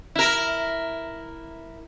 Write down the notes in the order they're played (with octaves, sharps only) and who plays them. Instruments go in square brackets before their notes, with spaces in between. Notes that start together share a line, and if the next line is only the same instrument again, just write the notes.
[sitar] E4 A#4